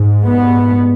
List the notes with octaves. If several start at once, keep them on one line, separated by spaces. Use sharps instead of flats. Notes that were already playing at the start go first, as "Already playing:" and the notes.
Already playing: G#2
B3